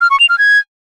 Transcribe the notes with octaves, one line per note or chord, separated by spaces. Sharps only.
F6
C#6
F7
F6
G#6